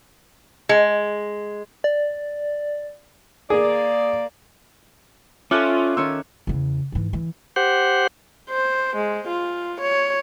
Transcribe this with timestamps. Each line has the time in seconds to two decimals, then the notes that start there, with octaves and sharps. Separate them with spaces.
0.69 G#3
1.84 D5
3.50 A#3 G#4 D5
5.51 C#4 F4 A4 D5 E5 D6 F6 F#6
5.97 D#3 C#4 C#5 E6
6.47 E2 C#3
6.92 G#2 E3
7.13 E3
7.56 G4 C5 F#5
8.50 C5
8.96 G#3
9.28 F4
9.81 C#5